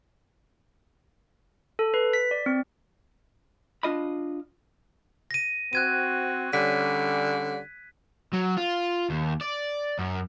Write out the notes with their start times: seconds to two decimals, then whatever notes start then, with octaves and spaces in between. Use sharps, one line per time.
1.79 A4
1.94 B4
2.13 B6
2.31 D5
2.46 C4
3.83 D4 F4 D#5 B5
5.31 A#6 D#7
5.73 C4 F#4 F#6 G#6 D#7
6.53 D3 G3 C#4 B6
8.33 F#3
8.57 F4
9.10 D#2
9.41 D5
9.99 F#2